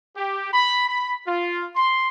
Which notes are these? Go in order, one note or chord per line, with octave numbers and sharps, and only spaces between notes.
G4
B5
B5
F4
C6